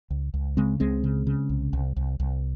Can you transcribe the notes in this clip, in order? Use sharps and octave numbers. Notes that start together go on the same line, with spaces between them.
C#2
C#2
C#3 G#3 C4
C#2 G#3 C4
C#3
C#3
C2
C2
C2
C2